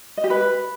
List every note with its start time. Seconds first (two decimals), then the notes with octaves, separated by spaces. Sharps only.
0.17 D#5
0.24 G4
0.30 B4